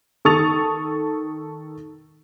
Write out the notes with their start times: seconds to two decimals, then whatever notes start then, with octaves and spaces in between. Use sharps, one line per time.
0.25 D#3 A4 C#6 D#6 A6 F7